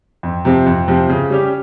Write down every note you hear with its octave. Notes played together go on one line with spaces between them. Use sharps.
F2
C3 F3 C4
F2
C3 F3 C4
C#3
G3 C#4 G4